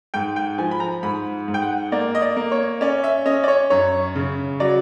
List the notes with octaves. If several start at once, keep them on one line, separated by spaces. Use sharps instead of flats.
G#2 G5
G5
F3 G#5
B5
A#5
G#2 B5
G#2
G5
F#5
A#3 D5
D#5
D5
A#3
C#5
C#4 D5
E5
C#4 D#5
D5
C#5
F#2 C#5
C#3
F#3 D5